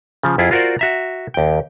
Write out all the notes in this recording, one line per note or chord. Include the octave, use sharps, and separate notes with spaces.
C#3 F3
F2 E4 F4 G#4
F4 F#4 A#4 C5 D5
F#4 E5 A#5
D#2 G5